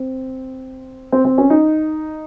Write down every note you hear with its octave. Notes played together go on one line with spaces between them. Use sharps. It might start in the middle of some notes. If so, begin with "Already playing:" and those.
Already playing: C4
C4
C4
C#4
D#4